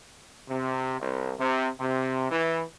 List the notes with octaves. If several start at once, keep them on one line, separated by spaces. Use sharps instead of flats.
C3
C2
C3
C3
E3